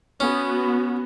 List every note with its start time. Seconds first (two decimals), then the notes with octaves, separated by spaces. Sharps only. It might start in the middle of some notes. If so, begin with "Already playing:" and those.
0.20 B3 C#4 F#4